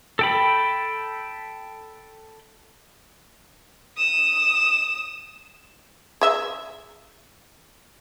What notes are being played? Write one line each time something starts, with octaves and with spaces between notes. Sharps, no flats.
A4 G5 B5
D#6 E7
G#4 E5